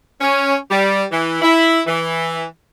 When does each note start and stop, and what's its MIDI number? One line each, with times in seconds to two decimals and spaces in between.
0.21 0.55 61
0.71 1.04 55
1.12 1.39 52
1.42 1.80 64
1.87 2.44 52